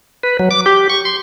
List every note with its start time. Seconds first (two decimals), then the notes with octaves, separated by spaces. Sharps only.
0.23 B4
0.39 F#3
0.51 D6
0.66 G4
0.90 C#6
1.05 C6